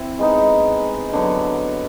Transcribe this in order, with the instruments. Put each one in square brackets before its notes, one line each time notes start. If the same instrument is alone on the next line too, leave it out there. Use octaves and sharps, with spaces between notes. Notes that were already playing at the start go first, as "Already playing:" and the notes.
Already playing: [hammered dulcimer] C4 E4
G#3 B3 D#4
D3 F#3 B3